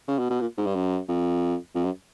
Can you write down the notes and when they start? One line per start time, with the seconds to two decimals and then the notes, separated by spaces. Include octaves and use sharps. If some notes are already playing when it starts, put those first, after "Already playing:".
0.08 C#3
0.19 B2
0.30 B2
0.41 A#2
0.58 G#2
0.67 G2
0.75 F#2
1.09 F2
1.75 F2
1.84 F#2